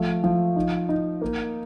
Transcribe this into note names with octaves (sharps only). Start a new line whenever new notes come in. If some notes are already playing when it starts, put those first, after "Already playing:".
Already playing: F3 A3
F3
D#4
D#4
A#3